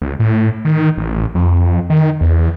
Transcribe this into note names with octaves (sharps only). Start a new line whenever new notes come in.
C#2
A2
D#3
A1
F2
D#3
E2